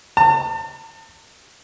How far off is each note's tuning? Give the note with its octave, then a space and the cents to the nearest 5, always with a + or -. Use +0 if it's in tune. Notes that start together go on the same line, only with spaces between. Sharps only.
A5 +40